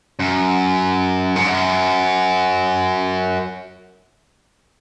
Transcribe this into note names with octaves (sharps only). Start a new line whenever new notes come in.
F#2
G#2
F#2